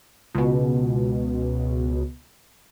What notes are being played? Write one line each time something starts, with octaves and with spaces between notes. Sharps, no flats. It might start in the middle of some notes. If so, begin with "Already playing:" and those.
C#2 B2